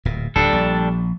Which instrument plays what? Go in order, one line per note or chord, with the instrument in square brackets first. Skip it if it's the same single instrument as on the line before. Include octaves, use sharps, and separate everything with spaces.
[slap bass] D1 A#2
[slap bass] D1 D#2 [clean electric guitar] G3 D4 A4
[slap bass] A#1